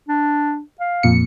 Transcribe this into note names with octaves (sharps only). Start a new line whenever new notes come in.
D4
F5
F2 A#2 C#7